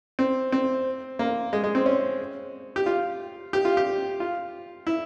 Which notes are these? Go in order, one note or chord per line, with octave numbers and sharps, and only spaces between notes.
C4
C4
A#3
G#3
G#3
C4
C#4
G4
F4
G4
F4
G4
F4
E4